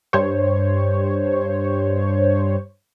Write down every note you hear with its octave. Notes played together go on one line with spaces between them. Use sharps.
G2 C5 C#5